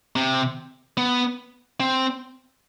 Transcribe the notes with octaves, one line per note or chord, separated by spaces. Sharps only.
C3
B3
C4